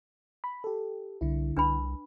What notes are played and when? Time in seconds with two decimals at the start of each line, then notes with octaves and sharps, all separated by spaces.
0.44 B5
0.64 G4 A4
1.21 C2 D3 E4
1.57 C2 D4 B4 B5